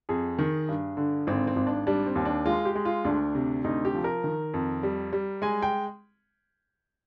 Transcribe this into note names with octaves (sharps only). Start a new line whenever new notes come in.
F2 G#4
D#3
G2
D3
G#1 C4
C4
G#1
D4
G3 D4
C4
D#2
D4
G#3 F4
G4
G#3
F4
D2 D4
C3
D2 D#4
G4
F3
A#4
D#3
F2
G3
G3
G#3 G#5
G5